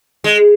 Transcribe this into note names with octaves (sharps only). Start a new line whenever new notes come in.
G#3